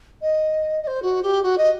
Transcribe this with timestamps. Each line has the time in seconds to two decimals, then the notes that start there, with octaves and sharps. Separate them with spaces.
0.22 D#5
0.82 D#5
0.87 C5
1.02 F#4
1.23 G4
1.43 F#4
1.58 D#5